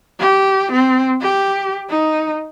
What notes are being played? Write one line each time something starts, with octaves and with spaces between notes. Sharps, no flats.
G4
C4
G4
D#4